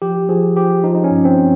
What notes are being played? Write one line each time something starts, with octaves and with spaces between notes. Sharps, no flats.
F3 G4
F3 G#4
F3 G4
F3 D#4
D#4
C#4
G2
C4